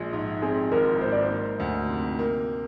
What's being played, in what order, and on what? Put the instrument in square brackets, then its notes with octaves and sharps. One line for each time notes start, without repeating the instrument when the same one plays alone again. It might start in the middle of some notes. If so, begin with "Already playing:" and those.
Already playing: [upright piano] A#1 G#3
G#2
[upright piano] C4 [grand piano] G#4
[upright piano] G#1 [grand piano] A#4
[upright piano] G#2 [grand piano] C5
[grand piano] D5
C5
[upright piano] A#3
D2
C3
A#3